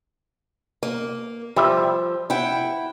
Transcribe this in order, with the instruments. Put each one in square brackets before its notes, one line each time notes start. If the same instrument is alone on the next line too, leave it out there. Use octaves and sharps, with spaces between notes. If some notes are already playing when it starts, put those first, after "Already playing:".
[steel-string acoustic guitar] A#3
[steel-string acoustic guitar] F3 [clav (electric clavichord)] G3 E5
[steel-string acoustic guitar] E4 F#5 G5